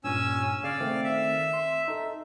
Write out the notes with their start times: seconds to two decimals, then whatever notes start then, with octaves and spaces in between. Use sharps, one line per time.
0.04 G2 A#2 C#4 G#5 E6
0.64 C#3 D5 F5
0.80 D#3 A3 C4
1.04 E5
1.53 C6
1.88 D#4 A4